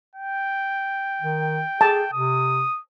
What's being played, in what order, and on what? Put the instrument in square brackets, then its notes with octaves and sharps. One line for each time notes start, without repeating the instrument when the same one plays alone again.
[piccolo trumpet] G5
[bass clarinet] D#3
[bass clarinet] G#4 [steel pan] A5
[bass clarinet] C3 [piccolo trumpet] D#6